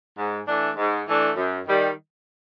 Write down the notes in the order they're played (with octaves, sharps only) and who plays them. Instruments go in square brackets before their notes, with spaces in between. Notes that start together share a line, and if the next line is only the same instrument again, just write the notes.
[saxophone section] G#2
E3 A3 D4
G#2
E3 A3 D4
F#2
D#3 G3